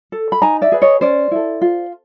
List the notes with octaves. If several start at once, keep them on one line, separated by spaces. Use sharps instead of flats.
A4
B5
D#4 G#5 A#5
D5 E5
G#4 B4
C#5 D#5
C#4 C5 D5
E4 A4
F4